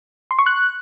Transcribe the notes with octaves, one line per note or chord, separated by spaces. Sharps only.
C6
C#6
F#6